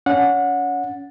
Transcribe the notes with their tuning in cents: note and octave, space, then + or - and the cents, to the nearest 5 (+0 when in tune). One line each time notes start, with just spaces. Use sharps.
C#4 +30 F#5 -20